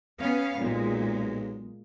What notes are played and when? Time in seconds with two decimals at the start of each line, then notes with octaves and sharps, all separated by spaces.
0.19 B3 C#4 F5
0.61 B1 A#2 G#3